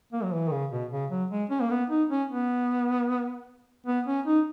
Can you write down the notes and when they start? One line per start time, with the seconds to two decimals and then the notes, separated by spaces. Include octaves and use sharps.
0.13 A#3
0.24 F#3
0.33 E3
0.48 D#3
0.52 C#3
0.71 B2
0.92 C#3
1.11 F#3
1.31 G#3
1.50 C#4
1.61 A#3
1.70 B3
1.90 D#4
2.10 C#4
2.30 B3
3.86 B3
4.07 C#4
4.26 D#4